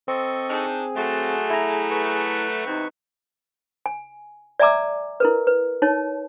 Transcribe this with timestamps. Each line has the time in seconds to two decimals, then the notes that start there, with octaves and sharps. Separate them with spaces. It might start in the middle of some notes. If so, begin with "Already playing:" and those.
0.08 C4 A4 D#5 C#6
0.49 D4 D#4 G#4
0.96 F#3 A3 F#4 A5 C6
1.50 E4 A#5
1.91 B4 C#6
2.66 E2 C3 C4 D#4
3.86 G#5
4.60 D5 E5 G#5 A#5 D6 E6
5.20 E4 A#4 B4
5.47 B4
5.82 D#4 C#5 A5